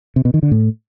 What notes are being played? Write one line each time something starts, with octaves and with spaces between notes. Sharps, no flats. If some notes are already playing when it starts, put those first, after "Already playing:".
C3
B2
D#3
D3
A2